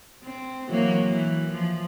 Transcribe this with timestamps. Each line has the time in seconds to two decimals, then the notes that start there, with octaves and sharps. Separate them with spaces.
0.24 C4
0.68 E3 F#3 A#3
1.03 E3
1.52 F3